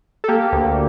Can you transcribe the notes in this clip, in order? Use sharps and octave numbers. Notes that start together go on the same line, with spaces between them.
A4
A#3 G4
D2